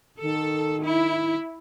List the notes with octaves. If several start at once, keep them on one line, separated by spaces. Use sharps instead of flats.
D#3 A4
E4